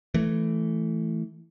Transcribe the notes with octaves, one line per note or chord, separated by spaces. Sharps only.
E3 A3